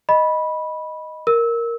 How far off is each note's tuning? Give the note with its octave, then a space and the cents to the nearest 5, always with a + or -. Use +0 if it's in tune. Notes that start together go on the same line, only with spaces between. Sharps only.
D#5 +0 B5 -10
A#4 +0 E6 -20